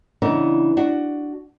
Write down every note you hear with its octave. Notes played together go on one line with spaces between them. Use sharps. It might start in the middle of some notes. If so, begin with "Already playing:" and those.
C#3 E3 B3 D4 D#4
D4 F#4